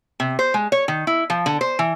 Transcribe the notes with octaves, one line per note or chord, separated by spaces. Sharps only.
C3
C5
G#3
C#5
D#3
E4
F3
D3
C5
E3